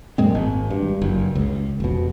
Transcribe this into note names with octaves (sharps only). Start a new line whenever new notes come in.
F#2 A#2 G#3 C4
G#1
G2
F#1
C#2
F1 B2